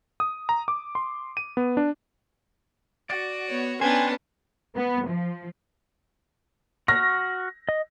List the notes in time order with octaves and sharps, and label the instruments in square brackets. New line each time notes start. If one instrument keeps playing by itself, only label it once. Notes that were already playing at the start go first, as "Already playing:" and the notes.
[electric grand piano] D#6
A#5
D6
C6
D#7
B3
D4
[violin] F#4 [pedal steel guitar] D5
[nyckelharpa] B3 C#5
[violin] B3 D4 [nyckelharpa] C#4 B4 [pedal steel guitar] C5 G5 [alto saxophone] G#5
[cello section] B3
F3
[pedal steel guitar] F#4 C#6 F6 [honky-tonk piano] A#6
[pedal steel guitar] D#5